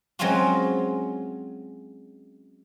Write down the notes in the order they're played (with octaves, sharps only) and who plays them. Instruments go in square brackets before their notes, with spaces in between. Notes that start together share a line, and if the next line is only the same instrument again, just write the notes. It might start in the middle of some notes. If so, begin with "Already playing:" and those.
[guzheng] F#3 G#3 C4 C#4 F4 F#4